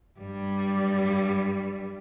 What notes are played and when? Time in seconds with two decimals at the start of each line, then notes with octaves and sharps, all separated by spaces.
0.19 G2 G3